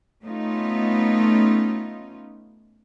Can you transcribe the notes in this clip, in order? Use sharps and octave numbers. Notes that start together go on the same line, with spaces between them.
A3 B3 C#4 D#4 F4